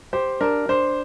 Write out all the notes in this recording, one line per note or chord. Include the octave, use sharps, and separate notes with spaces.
G4 C5
D4 A#4
D4 C5